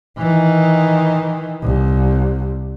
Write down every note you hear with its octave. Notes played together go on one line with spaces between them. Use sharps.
D#3 E3
C2